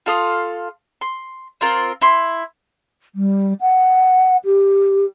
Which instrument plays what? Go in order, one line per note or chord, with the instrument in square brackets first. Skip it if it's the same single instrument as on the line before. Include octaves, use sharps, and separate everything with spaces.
[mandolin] F4 A4 F5 D#6
C6
C4 F4 A#4
E4 C6
[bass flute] G3
F#5
G4